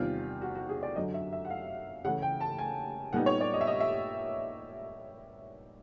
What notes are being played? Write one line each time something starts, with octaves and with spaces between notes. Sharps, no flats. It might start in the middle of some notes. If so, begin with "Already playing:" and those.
Already playing: E2 C3 D#3 G3 C4 F4
F#4
F#4
G#4
D5
F#2 D3 F#3 D#5
E5
E5
F#5
F5
C#3 E3 A3 F#5
G5
A5
G#5
A#2 G3 B3 D#4 F#5
C#5
D5
D#5
E5
D#5
E5